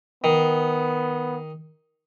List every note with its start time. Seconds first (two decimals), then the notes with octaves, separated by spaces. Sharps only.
0.24 D#3 B3